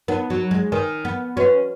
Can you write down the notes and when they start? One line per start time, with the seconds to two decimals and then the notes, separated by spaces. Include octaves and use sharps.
0.08 B3 D#4 A#4 C#5 F#5
0.30 F#3
0.51 G#3
0.72 D#3 A#4 C#5 G#5
1.05 B3
1.36 C#4 F#4 B4 D#5 F#5